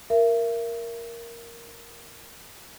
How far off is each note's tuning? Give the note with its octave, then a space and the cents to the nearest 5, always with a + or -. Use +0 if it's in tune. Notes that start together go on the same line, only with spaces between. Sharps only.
A#4 +0 E5 +30